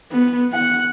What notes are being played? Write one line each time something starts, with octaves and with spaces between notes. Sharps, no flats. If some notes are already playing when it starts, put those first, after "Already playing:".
B3
F#5